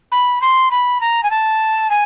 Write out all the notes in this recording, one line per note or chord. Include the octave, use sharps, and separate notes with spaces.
B5
C6
B5
A#5
G#5
A5
G#5